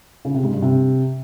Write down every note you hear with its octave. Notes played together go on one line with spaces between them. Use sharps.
C#3
C3
G#2
G2
C3